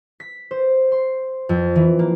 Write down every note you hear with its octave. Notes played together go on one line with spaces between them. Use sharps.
B6
C5
C6
F2
E3
A#3